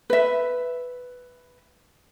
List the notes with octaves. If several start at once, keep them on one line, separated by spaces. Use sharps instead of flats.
B4 E5